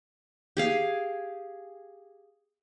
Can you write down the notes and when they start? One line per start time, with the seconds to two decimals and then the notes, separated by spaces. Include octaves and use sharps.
0.57 G4 G#4 F5